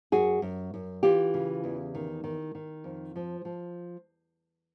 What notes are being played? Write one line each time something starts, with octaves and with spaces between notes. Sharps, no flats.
F#2 F#4 G#4
F#2
F#2
E3 F4 G4
C#3
E2
D#3
D#3
D#3
F2
F3
F3